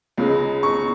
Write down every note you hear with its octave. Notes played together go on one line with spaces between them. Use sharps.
C#2 C#3 G#3
C#6